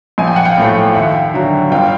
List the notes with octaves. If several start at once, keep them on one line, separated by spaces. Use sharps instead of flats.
A#1 G#5
G5
F#5
F5 G5
A2 F3 A3
D#2 E5 F#5
D3 F#3
G1 F5 G5